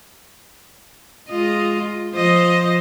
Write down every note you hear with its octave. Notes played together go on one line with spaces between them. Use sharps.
G#3 F4 D#5
F3 C5 D#5